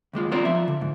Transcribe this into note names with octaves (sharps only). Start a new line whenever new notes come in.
D#2 G3 G#3 F4
B3 C4 F4 A#4 C5 D5
F3 E5
D3
G#2